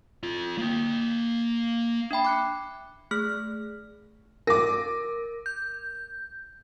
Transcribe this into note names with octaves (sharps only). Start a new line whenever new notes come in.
C4 F4
A#3 G5
D4 E5 G5 B5
D6 F#6 C#7
A3 G#4 F6
A#4 D6 A#6
G6